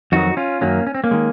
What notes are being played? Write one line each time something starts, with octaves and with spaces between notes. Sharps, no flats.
F2 D#3 F#3 D#4 F#4
C#4 F4
F#2 D#3 F#3 A#3 C#4
C#4
C4
A#3 C#4
D#3 G#3